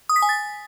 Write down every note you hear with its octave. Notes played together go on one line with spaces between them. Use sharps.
D#6
B6
G#5
A6